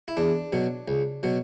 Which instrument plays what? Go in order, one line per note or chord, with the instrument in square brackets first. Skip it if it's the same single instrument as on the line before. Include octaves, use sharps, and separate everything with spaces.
[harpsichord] E4
E2 D4
B2 F#3
C#2
B2 F#3